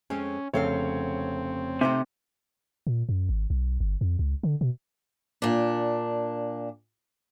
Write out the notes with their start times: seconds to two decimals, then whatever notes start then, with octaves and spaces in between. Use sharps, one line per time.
0.10 F2 G#3 C4 C#4
0.53 F1 C#3 B3 C4 A4 C#5 F5
1.81 C3 A3 D#4 C5
2.87 A#2
3.09 F#2
3.29 G#1
3.50 B1
3.80 G1
4.01 F2
4.19 C#2
4.43 D3
4.61 B2
5.42 A#2 D4